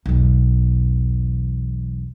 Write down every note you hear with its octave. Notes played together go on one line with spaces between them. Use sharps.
B1 E2